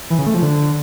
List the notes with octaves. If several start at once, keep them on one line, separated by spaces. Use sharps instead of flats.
E3
C#3
A3
F3
D3